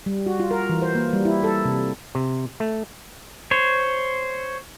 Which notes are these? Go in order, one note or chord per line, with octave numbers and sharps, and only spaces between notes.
G3
F#4
F4
A#4
E3
C5
A#3
G3
E4
A4
C3
C3
A3
C5 C#5